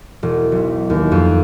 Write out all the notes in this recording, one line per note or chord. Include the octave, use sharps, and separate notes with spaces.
E1
B1
D#2
F2